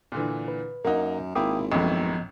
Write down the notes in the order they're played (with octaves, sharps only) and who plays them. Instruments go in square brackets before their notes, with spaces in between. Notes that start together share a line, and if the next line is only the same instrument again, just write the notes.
[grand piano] A#2 D3 E3
[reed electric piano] B4
[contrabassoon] F#2 [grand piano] A#3 D#4 [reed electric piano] A#4 F#5
[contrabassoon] G#1 [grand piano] A#3 E4 [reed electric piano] G5 D6 D#6
[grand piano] A1 F#2 A2 [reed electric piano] F3 B3 D#5